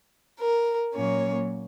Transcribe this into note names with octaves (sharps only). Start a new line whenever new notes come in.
A#4
A#2 F#3 A#3 C#4 C#5